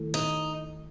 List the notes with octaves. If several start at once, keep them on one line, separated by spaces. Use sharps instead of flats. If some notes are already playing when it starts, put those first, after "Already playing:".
Already playing: D#3 A3 E4 A4
D#4